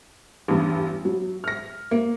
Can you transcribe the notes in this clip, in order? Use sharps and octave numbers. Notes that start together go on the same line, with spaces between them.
A1 E2 G2
F#3
F6 A#6
A#3